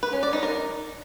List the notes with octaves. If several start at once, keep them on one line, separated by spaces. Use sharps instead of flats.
B4
C#4
D5
D#4
A#4